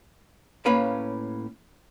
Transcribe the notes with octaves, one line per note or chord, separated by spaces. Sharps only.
A2 A#3 C#4 B4 F5 B5